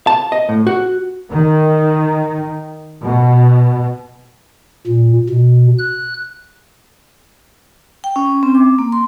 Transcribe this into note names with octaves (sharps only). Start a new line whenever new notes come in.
A5
D#5
A2
F#4
D#3
B2
A#2
B2
F#6
G5
C#4
C4
D6
A#3
C6